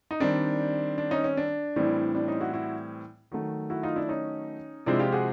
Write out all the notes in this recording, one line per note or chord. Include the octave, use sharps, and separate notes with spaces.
D#4
D#3 G3 C4 D4
D4
C#4 D#4
C#4
D4
A2 E3 G3 C4
D4
C#4 D#4
E4 F#4
E4 F#4
D#3 F#3 A3
E4 F#4
D#4 F4
D4 E4
C#4 D#4
C3 F3 G#3 C4 D4 E4
F4 G4
F#4 G#4